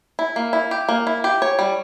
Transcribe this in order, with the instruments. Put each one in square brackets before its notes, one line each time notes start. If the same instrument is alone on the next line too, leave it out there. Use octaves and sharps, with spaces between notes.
[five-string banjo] E4
A#3
E4
G4
A#3
E4
G4
C#5
G3